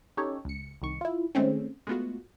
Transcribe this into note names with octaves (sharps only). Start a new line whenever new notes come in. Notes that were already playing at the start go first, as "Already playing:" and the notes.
C#4 D#4 G4 A4 C#5
C#2 C#7
C2 D#3 C#6
E4 F4
D#3 G#3 A3 C4 C#4
G#3 A3 B3 F4 F#4